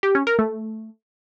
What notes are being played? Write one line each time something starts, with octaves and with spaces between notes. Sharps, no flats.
G4
C#4
A#4
A3